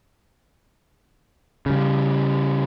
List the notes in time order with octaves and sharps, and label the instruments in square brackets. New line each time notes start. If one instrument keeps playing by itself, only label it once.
[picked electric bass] C#3 G3